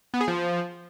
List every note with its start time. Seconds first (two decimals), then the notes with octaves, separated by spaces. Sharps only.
0.14 B3
0.21 G#4
0.28 F3